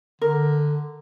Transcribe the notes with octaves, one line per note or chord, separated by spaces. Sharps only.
D3 A#4